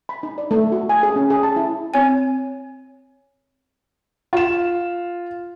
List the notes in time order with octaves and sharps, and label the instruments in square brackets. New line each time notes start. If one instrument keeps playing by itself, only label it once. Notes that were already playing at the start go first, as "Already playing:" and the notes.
[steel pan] B5
D#4
D5
A3
F#4
G#5
G#4
C#4
G#4
A5
E4
[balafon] C4 C#5 G#5
[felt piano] F4 E7